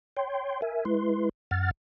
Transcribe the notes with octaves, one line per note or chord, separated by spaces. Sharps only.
C#5 G5 C6
A#4 E5 G#5
G#3 E4 B4 C6
F#2 F#5 F6 A6